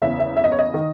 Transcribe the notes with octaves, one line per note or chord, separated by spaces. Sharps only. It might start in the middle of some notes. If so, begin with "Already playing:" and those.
F#1 E2 C#3 E5
E5
E5
D#5
C#5
D#5
D#3